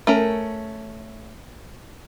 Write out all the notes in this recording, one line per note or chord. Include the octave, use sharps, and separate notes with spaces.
A3 C#4 A#4